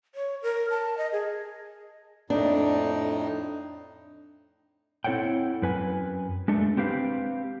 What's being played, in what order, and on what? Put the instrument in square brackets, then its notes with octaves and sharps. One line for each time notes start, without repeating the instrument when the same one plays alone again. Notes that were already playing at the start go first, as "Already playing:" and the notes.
[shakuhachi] C#5
A#4
A5
D#5
G#4
[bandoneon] F2 A2 D#4 [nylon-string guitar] D4
[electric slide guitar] C4 E4 A4 C#5 F#5 G5
F#2 B4 G#5
G#3 A3 D4 A4
C4 G4 B4 F5